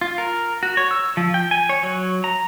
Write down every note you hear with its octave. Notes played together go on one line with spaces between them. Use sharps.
F4
A#4
F#4
C#5
E6
F3
G5
G#5
C#5
F#3
A#5